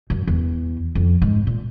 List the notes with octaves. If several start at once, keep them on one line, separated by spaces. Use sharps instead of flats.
F#2
E2
F2
G#2
A#2